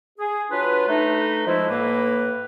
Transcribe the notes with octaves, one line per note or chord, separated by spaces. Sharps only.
G#4
F#3 D4 F4 B4
A3 D#4 B4
F3 G#3 E4
A2 A#3 B4